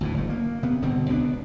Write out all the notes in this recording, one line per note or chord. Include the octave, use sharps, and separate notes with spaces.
D2 A2 E3
F#1 A3
A#3
C3 B3
G1 B2 D3 C4
C#2 B3 D4